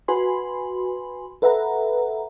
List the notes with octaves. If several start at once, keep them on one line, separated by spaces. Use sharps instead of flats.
F#4 B4 G#5 B5 C6
A4 B4 E5 F#5 A#5